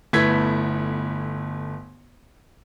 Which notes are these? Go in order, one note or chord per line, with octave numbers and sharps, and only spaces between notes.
G1 A3 B3 E4 G#6 B6